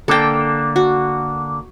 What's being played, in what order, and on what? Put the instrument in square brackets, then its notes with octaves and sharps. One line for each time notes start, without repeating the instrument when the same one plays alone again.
[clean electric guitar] D3 A#3 D4 [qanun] A4 G5
[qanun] F#4